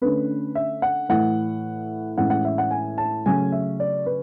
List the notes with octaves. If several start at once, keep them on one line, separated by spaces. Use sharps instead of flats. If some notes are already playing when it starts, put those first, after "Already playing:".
D3 A3 C#4 B4
E5
F#5
A2 E3 A3 F#5
A2 E3 G#3 C#4 F#5
F#5
E5
F#5
G#5
A5
C#3 F#3 A3 C#4 G#5
E5
D5
B4